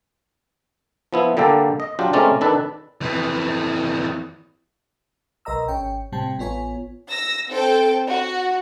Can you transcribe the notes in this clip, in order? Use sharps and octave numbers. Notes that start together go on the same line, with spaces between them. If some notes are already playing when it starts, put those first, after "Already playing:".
F3 B3 E4
D3 G3 A#3 G4 A4
D#5
F#3 D4 F4 G4
G#3 A3 C4 C#4 A#4 D5
D#3 D4 A4 B4
F2 E3
B1 A#4 D#5 A#5 E6
G#1 C#4 C#5 G5
A2 C3 G3 C4 G5 A5
A1 B3 F4 C#5 G#5
E6 A#6
C4 A4 G5
F#4